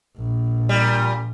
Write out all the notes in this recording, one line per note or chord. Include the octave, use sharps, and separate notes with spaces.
A#1
A#2 G3